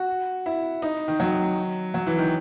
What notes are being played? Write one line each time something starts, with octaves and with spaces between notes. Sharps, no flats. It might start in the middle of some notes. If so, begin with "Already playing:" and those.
Already playing: F#4
E4
D#4
D#3
F#3
F#3
E3
D#3